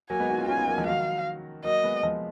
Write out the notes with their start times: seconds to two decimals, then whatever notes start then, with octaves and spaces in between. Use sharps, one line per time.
0.10 F#3 A#3 G#5
0.20 G#3 B3
0.30 D#4 F#4
0.38 C#4 F4
0.48 C#4 F4 G#5
0.58 B3 D#4
0.68 F#3 A#3
0.78 F3 G#3
0.87 D#3 F#3 F5
1.64 F#3 A#3 D#5
1.84 G#3 B3
2.03 F3 G#3